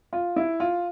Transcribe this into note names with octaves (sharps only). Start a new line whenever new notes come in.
F4
E4
F4